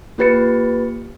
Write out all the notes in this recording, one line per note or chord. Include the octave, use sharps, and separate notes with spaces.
A#3 F4 G4 B4 A6 C#7